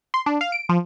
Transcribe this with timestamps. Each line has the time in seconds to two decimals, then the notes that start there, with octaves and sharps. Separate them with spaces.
0.14 C6
0.26 D4
0.41 F5
0.52 D7
0.69 F3